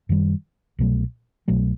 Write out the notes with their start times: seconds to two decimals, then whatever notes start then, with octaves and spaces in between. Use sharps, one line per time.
0.09 F#2 D#3 G3
0.79 C2 B2 F#3 A3
1.48 C2 B2 F#3 A3